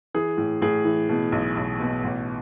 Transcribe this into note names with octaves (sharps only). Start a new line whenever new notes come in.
E3 G#4
A2
A2 G#4
E3
B2
B1
B1
B2
A1